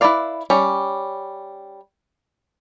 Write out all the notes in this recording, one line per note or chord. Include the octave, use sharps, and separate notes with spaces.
E4 F4 B4 D5 F5
G3 C#4